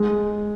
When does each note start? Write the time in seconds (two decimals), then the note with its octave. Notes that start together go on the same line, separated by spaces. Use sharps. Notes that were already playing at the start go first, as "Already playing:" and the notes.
Already playing: G#3